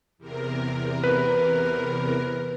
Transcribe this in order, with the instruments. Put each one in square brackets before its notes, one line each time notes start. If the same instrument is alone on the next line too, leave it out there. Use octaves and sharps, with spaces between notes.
[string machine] E2 C3 A#4
[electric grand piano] B4